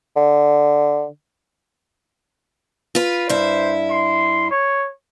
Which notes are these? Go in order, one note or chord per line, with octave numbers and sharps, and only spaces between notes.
D3
F4 B4
G2 E4 C5
C6
C#5